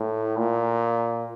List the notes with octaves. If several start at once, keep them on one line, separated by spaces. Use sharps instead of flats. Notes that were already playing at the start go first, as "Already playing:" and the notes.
Already playing: A2
A#2